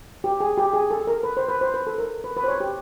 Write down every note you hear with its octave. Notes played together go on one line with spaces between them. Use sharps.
G4
G#4
G4
G#4
A4
A#4
B4
C5
B4
C5
B4
A4
A#4
B4
B4
C5
C#5
G4